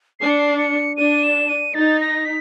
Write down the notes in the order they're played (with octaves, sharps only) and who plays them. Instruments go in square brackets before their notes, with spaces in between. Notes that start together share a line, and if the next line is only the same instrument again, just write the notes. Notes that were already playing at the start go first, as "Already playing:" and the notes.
[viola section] D4 [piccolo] C7
[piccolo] C#7
C7
C#7
[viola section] D4 [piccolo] D#7
[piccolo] E7
D#7
[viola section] D#4 [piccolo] A6
[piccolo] A#6
B6